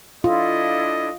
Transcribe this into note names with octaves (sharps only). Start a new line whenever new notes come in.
D4 E4 F4 A4 D#5